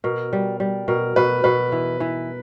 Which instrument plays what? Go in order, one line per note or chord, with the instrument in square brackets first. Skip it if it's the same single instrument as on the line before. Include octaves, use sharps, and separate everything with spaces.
[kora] B2 [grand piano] A#4
[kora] G3
G3
[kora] B2 [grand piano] A#4
[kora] B2 [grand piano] B4
[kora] B2 [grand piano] B4
[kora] E3
E3